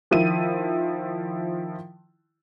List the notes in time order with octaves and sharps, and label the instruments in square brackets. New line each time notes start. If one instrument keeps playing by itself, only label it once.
[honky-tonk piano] D#3 F3 E4 D#7